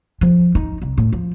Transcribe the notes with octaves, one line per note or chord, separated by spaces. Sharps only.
F3
D#4
C2
A2
F3